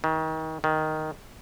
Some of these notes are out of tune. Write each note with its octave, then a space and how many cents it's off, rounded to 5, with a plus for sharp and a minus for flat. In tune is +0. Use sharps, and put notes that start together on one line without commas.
D#3 +30
D#3 +0